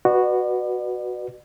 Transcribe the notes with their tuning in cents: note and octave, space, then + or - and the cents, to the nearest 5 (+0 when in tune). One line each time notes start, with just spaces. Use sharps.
F#4 +0 B4 +0 D5 +45